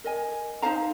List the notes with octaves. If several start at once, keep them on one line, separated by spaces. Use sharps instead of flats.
A#4 D#5 G#5
D#4 C5 F5 A#5